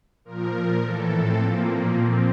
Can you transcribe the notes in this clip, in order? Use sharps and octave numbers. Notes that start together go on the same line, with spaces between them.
A#2 F3 A#4
A2 E3 A4
C4
A#2 F3 A#3
A#2 F3 C4